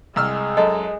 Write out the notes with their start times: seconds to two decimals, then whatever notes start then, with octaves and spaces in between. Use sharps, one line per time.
0.16 C2 G#3 E6 F6
0.57 F#2 A4 D#5